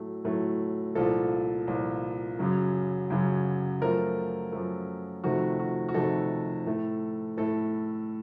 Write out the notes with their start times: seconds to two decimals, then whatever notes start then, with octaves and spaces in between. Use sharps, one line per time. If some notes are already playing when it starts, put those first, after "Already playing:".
Already playing: A2 F#3 A3
0.24 A2 F#3 A3
0.95 C2 A#2 F3 A4
1.67 C2 A#2 F3
2.39 F#2 C#3 F#3
3.10 F#2 C#3 F#3
3.81 F#2 F3 A3 A#4
4.52 F#2 F3 A3
5.24 F2 C3 D#3 A3 F#4
5.59 F#4
5.89 F#4
5.94 F2 C3 D#3 A3 A4
6.66 A2 A3
7.37 A2 A3 A4